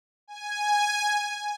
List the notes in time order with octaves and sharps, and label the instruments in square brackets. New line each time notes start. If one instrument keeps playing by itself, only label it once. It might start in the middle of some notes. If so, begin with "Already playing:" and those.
[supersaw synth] G#5